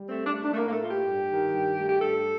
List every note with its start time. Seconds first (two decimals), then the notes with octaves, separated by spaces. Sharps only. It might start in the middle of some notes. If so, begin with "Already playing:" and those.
Already playing: G3
0.09 A3 C4
0.26 D4
0.33 A3
0.42 D4
0.53 A3
0.57 A2 A#3
0.67 A#3
0.73 A3
0.81 A2 F4
0.89 G4
1.06 G2
1.29 D#3
1.53 G2
1.77 A3
1.90 G4
2.00 G2 A4